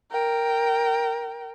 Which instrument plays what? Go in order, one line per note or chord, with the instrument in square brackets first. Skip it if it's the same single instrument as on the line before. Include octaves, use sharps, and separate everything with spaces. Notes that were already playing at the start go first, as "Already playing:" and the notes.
[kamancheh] A#4 G5